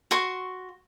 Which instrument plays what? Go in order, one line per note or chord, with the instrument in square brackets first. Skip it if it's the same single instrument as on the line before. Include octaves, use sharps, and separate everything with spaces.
[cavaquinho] F#4 C6 C#6